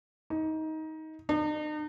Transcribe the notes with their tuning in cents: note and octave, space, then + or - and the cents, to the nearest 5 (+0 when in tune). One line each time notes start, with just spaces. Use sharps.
D#4 +20
D#4 -40